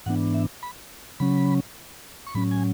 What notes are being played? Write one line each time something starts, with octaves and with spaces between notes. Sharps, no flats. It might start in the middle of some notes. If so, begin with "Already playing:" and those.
G#2 E3 B3 D4 F#5
E5
B5
C#3 F#3 C#4 B5
C#6
A2 F#3 C#4 B5
G#5